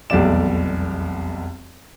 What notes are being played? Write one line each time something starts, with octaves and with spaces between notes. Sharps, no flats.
F1 B1 E2 G3 D5 E7